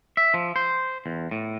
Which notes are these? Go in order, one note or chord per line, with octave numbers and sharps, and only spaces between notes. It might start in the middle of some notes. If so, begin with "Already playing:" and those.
E5
F3
C5
E2
A2